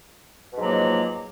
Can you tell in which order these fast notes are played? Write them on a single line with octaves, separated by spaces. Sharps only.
B2 G#2 F#3 A#3 F3